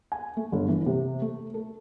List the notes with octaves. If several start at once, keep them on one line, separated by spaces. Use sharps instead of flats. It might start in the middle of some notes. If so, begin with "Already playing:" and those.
G#5
A3
G1
E3
C3
A3
A4